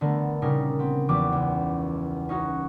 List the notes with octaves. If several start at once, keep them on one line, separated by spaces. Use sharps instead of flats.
D3 A3 B3 A#4
A#2 C#3 G3 D#4 A#4
B3 C4
E2 F3 G3 B3 F#4 D6
C#2
C#4 D#4 F#4